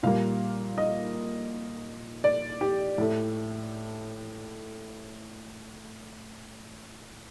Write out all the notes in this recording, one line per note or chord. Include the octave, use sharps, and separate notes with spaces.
A#2 G3 A#3 F5
D#5
D5
G4
A2 A3